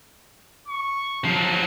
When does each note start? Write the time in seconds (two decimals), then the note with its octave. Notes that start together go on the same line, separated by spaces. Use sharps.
0.68 C#6
1.25 F3 F#3